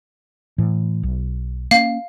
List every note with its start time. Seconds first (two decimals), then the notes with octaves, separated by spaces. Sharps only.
0.58 A2 E3
1.03 B1
1.71 A#3 C#4 F5